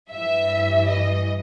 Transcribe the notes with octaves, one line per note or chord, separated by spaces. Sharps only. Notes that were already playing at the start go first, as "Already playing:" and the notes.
G2 E3 E5
D#5